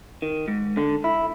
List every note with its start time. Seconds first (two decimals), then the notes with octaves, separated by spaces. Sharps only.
0.22 D#3
0.48 G#2
0.77 D3
1.04 E4